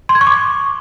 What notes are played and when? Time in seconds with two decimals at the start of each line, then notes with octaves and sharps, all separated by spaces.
0.09 C6
0.15 G#6
0.21 C#6
0.27 D6